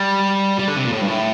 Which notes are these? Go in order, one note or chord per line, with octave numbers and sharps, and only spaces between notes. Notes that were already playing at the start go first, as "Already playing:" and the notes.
Already playing: G3
G3
D3
C3
A#2
A2
G2
A2